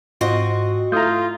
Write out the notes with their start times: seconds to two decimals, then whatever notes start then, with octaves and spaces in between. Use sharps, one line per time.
0.21 G#2 C4 F4 F#4 D#5
0.92 A3 E4 F4 A#5 D#6 G6